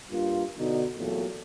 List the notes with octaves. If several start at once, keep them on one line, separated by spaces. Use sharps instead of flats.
G2 A#3 F4
B2 D3 D4 D#4
E2 A#2 F#3 A3